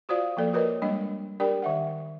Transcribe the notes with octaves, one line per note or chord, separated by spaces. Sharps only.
F4 F#4 C5 D5 F5
F3 A#3 A4 D5
F#4 A#4 B4 C#5 D#5
G3 G#3 A#3 D4 D#5
D4 G4 A#4 D5 G5
D#3 E5 F#5